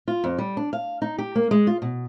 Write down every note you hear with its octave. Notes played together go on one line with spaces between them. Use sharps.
F4
F2
G3
D4
F5
D#4
G4
A#3
G#3
F4
B2